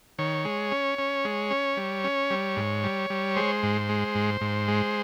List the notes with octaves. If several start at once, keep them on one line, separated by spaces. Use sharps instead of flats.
D#3 C#5
G#3
C#4
C#4
G#3
C#4
G3
C#4
G3
G#2
G3
G3
G#3 C5
G#2
G#3
G#2
G#2
G#3